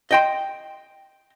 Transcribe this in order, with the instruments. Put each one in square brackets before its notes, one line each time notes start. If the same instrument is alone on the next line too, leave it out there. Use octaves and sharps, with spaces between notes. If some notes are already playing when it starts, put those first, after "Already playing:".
[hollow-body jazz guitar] D#5 G5 C6